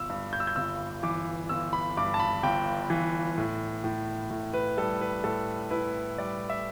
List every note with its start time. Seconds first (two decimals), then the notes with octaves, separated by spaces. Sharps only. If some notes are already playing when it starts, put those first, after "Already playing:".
Already playing: G1 E6
0.10 G2
0.33 G6
0.40 E6
0.47 G6
0.56 G1 E6
1.03 E3 D6
1.49 G1 E6
1.73 B5
1.97 G2 D6
2.14 A5
2.20 B5
2.43 G1 G5
2.90 E3
3.38 A2
3.84 A2
4.30 A2
4.54 B4
4.77 G3 A4
5.01 B4
5.24 A2 A4
5.70 E4 B4
6.18 G3 D5
6.50 E5